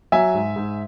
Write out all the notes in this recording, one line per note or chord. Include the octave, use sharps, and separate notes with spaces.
F#3 E5 G#5
G#2
G#2